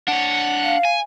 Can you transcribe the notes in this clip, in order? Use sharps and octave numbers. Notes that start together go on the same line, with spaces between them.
D4 C#5 F#5
F5
G#5